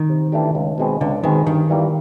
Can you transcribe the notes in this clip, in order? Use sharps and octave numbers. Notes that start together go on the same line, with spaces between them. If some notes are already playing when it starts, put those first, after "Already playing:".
Already playing: D#3
C3
E3 A3 D4 G4
C#2
B2 G#3 C4
C#2 D3
B2 D#3 G#3 C4
G2 D#3
E3 G3 A#3